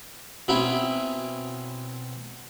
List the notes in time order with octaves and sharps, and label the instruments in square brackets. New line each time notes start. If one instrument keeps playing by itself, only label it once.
[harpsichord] B2 C4 C#4 D#4 E4